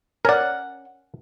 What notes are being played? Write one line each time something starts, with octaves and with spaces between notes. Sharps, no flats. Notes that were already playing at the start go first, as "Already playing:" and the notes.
C#4 A#4 D5 F#5